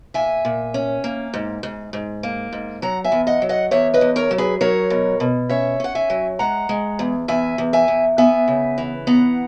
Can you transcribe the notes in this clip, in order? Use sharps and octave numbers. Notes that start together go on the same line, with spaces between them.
A#2 E5 G#5
A#2
C#4
A#3
G#2
G#2
G#2
A#3
G#2
F#3 F#5 A#5
E5 G#5
E2
D#5 F#5
F#3
D#5 F#5
E2 C#5 E5
B4 D#5
E2
A#4 C#5
F#3
G#4 B4
F#3 A#4 C#5
B2
B2
C#4 C#5 E5
C#4 F#5
E5 G#5
F#3
G#3 F#5 A#5
G#3
E2
E2 E5 G#5
E2
E5 G#5
E2
B3 E5 G#5
C#3
E3
B3 F#5 A#5